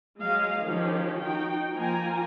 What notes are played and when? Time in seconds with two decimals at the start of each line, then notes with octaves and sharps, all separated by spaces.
0.19 F#3 G#3 D#5 F5
0.63 D#3 F3 C#4 D#4 G4
1.21 D#4 F#4 G5
1.75 F3 A#3 F4 G5 G#5 A#5